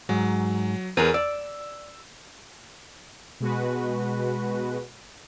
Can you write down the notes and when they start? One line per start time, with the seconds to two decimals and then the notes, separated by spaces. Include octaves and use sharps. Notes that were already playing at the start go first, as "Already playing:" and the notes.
0.09 G#2 F#3
0.97 E2 G#4 A#4 B4
1.14 D5 E6
3.40 B2 G#3 F#4 B4